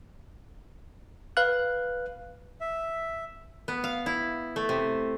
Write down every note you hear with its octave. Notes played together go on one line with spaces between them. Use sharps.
B4 F5 F#6
E5
B3
F5
E4
A3
C3